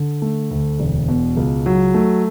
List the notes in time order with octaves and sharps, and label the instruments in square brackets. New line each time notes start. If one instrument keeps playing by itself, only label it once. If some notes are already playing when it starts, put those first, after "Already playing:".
Already playing: [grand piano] D3
A3
D2
E1
B2
C#2
F#3
A3